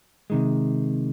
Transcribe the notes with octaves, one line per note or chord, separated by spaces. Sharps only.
C3 D#3 G#3